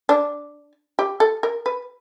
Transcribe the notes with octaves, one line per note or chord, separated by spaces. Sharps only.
D4
G4
A4
A#4
B4